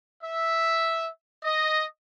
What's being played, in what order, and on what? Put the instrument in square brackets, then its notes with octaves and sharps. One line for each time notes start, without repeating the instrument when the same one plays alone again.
[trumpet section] E5
D#5